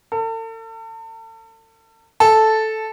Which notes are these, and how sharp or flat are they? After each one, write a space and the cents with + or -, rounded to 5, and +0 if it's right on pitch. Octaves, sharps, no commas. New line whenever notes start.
A4 +40
A4 -5